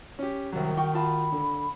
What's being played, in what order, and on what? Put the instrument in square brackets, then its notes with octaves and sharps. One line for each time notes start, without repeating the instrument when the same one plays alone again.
[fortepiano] C#4 G4
[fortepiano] C2 F#3 [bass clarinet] D#3
[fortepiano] F#4 G5 C#6
[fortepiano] F4 F#4 A5 [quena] B5
[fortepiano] D3